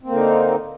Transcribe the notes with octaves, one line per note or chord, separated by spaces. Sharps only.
D3 A#3 C4 D#4